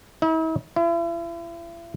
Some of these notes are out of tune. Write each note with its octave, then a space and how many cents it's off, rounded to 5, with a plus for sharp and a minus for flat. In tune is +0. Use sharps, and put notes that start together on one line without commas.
E4 -45
E4 +40